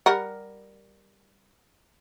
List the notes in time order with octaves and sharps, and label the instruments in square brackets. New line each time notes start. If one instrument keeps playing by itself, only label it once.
[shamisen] G3 A#4 F#5